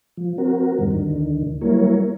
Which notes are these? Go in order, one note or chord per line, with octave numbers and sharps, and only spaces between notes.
F3
C4 F#4 A#4
E2 G2 D#3 G3
D2 D3 D#3
F#3 G3 A#3 E4 A#4 C#5